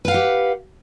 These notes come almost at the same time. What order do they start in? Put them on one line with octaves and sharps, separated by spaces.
B4 F5 F#5 G4